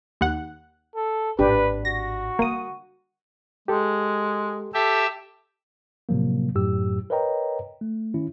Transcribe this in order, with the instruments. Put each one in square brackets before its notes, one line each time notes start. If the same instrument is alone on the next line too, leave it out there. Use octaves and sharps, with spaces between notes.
[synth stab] D#2 F#5
[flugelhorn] A4
[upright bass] G#1 A2 [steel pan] D4 G4 [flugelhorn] B4
[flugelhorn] F#4 [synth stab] A#6
[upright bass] D#3 G3 [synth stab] A#3 D#6
[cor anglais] G#3 [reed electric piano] G4 A4
[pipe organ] G4 E5 [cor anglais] A4
[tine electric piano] A2 C3 F3 F#3 A#3
F#2 A2 F#3 G4 E6
A#4 B4 C#5 D#5 G5 A#5
A3
D#3 C#4 E4